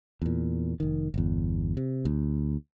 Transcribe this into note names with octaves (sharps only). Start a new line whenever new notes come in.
E2 A#2
F1 D#3
G1 E2
C3
D2